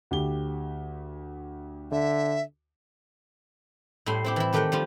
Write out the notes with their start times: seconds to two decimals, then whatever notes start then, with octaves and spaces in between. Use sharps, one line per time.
0.11 D2 G4 G7
1.92 D3 E5
4.06 A2 G3 E4 C6
4.24 C4 E4 G4
4.36 E3 E4
4.53 D#3 A3 G4 A#4 F#5 G5
4.72 F3 G3 F4